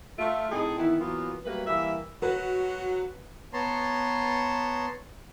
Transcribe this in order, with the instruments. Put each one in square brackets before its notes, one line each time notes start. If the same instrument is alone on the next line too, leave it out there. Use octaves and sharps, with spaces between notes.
[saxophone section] A3 F4
A2 C4 D#4 G#4 A4 D#5
D#3 E3 B3 E4
E3 F#3 A#3 B3 F4
F#3 G3 A3 A#3 B4
E3 G3 A#3 E5
[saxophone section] F#3 F#4 [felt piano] B4
[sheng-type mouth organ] B3 C#5 A5 A#5 C6